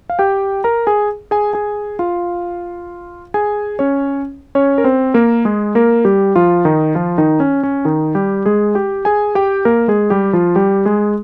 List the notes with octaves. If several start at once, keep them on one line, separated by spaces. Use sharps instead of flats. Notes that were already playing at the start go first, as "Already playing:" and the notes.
F5
G4 G5
A#4 A#5
G#4 G#5
G#4 G#5
G#4 G#5
F4 F5
G#4 G#5
C#4 C#5
C#4 C#5
A#4
C4 C5
A#3 A#4
G#3 G#4
A#3 A#4
G3 G4
F3 F4
D#3 D#4
F3 F4
D#3 D#4
C#4
C#4
D#3 D#4
G3 G4
G#3 G#4
G4 G5
G#4 G#5
G4 G5
A#3 A#4
G#3 G#4
G3 G4
F3 F4
G3 G4
G#3 G#4